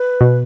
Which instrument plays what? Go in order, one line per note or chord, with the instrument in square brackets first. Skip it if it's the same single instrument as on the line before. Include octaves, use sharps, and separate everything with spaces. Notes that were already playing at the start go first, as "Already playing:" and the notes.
Already playing: [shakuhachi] B4
[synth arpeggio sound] B2